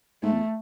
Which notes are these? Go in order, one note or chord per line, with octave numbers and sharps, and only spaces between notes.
G#2 A3
E2